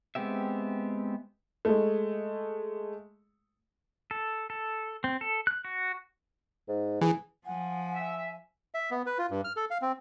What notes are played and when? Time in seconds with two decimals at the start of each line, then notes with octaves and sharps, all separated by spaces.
0.15 G#3 B3 C4 G4 E5
1.65 G#3 A3
4.11 A4
4.50 A4
5.04 C4
5.21 A4
5.47 F#6
5.65 F#4
6.68 G#2
7.01 E3 G#4
7.46 F3 F#5 G#5
7.94 E5
8.74 E5
8.91 B3
9.06 B4
9.18 F4
9.31 G2
9.44 F6
9.56 A4
9.70 F5
9.82 C4